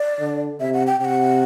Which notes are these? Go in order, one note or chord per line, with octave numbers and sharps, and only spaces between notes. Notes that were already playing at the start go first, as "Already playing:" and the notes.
Already playing: D5
D3
C3 E5
F#5
G5
C3 F#5 G5